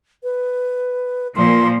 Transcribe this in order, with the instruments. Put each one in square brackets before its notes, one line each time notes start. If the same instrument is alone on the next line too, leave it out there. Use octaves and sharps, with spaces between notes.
[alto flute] B4
[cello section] A#2 F3 [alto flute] C6